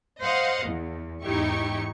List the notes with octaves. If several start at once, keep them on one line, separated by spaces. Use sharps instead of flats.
C5 D#5 F5 F#5
E2
E2 G#2 D#4 E4 G4 C#6